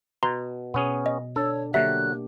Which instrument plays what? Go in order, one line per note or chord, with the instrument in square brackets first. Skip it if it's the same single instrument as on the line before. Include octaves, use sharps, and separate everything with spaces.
[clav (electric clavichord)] B2 [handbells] A#5 C6
[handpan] B2 [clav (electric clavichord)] B3 C#4 G#4
[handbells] D#5
[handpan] D4 [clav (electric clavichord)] A4 [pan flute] C#5
[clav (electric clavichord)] D3 F#3 [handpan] A#3 G4 [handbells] E5 [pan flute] F#6